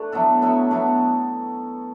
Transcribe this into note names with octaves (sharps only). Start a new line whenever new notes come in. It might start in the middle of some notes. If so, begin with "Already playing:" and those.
Already playing: A3 D4
F#3 B3 E4 A4
F#3 B3 E4 A4
F#3 B3 E4 A4